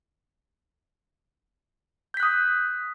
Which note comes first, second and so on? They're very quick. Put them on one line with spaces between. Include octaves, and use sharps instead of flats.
G6 B6 F#6 D#6